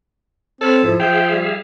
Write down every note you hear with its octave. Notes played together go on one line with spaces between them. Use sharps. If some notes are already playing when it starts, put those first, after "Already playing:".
C4 A4 C#5 B5 F6
G#2 F3 E4
F3 G#4 E5 F5 G5
G3